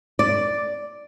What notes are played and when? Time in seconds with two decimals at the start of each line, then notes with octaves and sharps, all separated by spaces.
0.19 D5